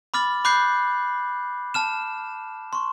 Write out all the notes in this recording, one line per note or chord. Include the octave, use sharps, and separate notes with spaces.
B5 D6 F6 A6 F#7
B5 D6 F#6 G6 C7
A5 F6 E7
C6 C#6